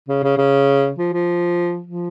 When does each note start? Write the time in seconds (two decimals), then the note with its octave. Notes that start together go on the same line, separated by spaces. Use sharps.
0.09 C#3
0.23 C#3
0.38 C#3
0.98 F3
1.13 F3
1.87 F3